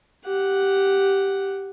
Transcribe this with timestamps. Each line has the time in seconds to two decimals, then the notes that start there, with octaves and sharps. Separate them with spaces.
0.25 G4 F#5